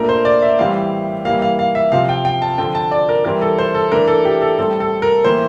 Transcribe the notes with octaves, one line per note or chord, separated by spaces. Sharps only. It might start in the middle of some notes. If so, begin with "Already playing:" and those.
Already playing: A#2 A3 D4 A#4
C5
D5
E5
A2 E3 G3 C4 F5
E3 G3 A#3 F5
F5
F5
E5
C3 F3 C4 F5
G5
G5
A5
D3 F3 C4 G5
A5
D5
A#4
E3 G3 C4 A#4
A4
C5
A4
E3 A3 D4 A#4
A4
G4
A4
A2 G3 C4 A4
A4
A#4
A2 E3 A#3 C5